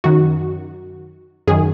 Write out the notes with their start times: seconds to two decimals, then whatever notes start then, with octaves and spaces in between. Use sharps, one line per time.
0.04 F#2 D#3 F#4
1.47 F#2 D#3 G#4